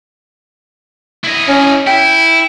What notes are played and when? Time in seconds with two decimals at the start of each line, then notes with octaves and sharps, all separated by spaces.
1.24 E4 D#5
1.49 C#4
1.87 E4 G5